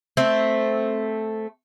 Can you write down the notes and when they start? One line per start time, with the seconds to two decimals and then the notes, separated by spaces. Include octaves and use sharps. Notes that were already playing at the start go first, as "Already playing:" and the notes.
0.17 A3 C4